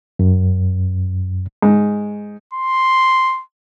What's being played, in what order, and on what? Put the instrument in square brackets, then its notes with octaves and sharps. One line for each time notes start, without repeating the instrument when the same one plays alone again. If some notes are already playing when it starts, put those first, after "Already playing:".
[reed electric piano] F#2
[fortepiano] G#2
[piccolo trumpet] C6